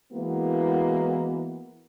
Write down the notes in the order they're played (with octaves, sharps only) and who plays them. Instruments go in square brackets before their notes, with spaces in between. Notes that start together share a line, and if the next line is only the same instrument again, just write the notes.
[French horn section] E3 G#3 A#3 B3 E4 F#4